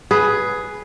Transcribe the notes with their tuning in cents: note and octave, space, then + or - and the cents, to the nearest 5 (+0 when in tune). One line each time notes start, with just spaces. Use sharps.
G#4 +10 B4 +0